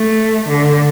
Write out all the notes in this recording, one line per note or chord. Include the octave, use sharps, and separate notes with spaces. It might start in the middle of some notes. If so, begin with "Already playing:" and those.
Already playing: A3
D3